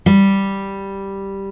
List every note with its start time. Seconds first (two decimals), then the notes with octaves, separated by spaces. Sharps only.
0.06 G3